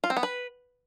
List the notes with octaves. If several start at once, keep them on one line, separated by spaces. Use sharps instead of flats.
F4
C4
B3
B4